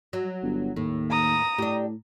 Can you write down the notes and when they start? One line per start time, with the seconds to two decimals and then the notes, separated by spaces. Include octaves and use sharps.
0.13 F#3
0.43 G1
0.76 D#2 A2
1.10 A#5 D#6
1.58 A2 D4 G4